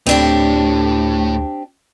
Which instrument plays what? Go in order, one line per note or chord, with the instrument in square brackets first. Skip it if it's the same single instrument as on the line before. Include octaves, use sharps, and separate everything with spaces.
[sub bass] D2 [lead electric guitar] A2 [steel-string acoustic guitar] C4 D4 G4